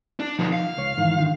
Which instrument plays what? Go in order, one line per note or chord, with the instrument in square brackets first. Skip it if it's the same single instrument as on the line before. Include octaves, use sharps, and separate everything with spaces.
[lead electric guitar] D4
[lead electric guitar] B2 D3 [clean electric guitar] F3 D#4
[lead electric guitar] F5
[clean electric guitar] C#2 C#5
G#2 D#3 E3
D3 D#3 F3